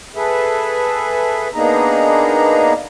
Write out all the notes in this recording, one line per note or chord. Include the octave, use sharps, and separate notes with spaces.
G#4 A4 B4 E5
A#3 B3 D4 D#4 G#4 A#5